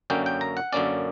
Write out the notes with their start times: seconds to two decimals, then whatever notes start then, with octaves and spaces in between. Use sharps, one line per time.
0.10 F#2 D3 A#3 C#4 G5
0.26 G5
0.41 A#5
0.57 F#5
0.72 F#2 D3 A#3 C#4 D5